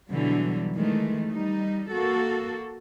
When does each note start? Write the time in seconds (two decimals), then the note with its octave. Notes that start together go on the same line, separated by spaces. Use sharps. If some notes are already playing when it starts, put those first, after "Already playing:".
0.11 B2 D3 E3 F#3 G3
0.76 D#3 E3 G#3 A3
1.31 G3 D#4
1.91 A#3 F#4 A4